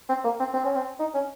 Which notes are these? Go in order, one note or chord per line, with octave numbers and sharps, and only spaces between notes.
C4
A#3
C4
C4
C#4
C4
D#4
C#4